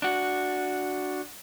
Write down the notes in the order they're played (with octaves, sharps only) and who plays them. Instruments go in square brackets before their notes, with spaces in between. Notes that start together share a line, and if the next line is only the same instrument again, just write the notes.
[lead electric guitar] D4 F#4